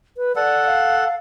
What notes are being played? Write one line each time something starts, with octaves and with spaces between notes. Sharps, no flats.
B4
A4 D5 F#5
F5